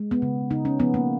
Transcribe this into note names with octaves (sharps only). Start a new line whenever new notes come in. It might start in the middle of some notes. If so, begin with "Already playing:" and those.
Already playing: G#3
B3
C#3
C#3 D#4
C#4
F3 B3
A#3